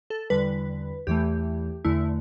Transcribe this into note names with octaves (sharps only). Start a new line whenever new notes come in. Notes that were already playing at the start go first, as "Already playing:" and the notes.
A4
E2 D3 G3 B4
E2 E3 A3 G4
E2 D3 A3 E4